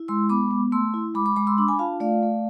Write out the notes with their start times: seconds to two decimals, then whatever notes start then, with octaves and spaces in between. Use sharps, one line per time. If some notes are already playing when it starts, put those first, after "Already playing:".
Already playing: E4
0.08 G#3 C6 E6
0.29 B3 B5 D6
0.51 B3
0.72 A3 C6 E6
0.94 E4
1.15 G#3 B5 D6
1.26 B5 D6
1.36 G#3 B5 D6
1.47 C6 E6
1.58 D4 B5 D6
1.68 G#5 B5
1.79 F4 F5 A5
2.00 A3 D5 F5
2.22 A3